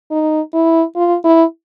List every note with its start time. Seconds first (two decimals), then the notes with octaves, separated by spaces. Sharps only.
0.11 D#4
0.54 E4
0.96 F4
1.25 E4